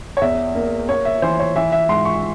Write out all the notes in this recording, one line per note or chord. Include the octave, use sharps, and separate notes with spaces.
C#5
E2 E5
A#3
A#3 C#5
E5
E3 C5
C#5
E3 E5
E5
G#2 C6
C#6